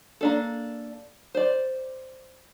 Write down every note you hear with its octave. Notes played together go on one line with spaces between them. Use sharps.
A#3 D4 A4
C5 D5